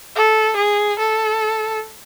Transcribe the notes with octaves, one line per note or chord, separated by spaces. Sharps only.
A4
G#4
A4